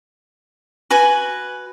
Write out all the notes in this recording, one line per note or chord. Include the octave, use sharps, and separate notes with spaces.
F#4 B4 G#5